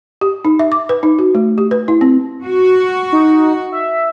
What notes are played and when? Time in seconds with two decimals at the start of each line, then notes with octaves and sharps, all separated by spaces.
0.21 G4
0.45 D#4
0.59 E5
0.72 D6
0.89 B4
1.03 D#4
1.19 F#4
1.35 A3
1.58 G4
1.71 B4
1.88 E4
2.01 C4
2.45 F#4
3.12 D#4
3.72 E5